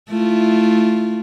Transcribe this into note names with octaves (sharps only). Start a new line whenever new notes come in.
A3 E4 F4